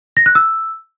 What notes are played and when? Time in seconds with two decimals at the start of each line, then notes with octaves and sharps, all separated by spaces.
0.17 A#6
0.26 F#6
0.35 E6